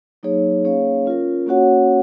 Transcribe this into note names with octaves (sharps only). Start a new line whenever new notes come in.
F#3 A#3 D#4 G#4 C#5
A#3 C#4 G#4 C#5 F5
C#4 F4 A#4
A#3 C#4 F#4 C#5 F#5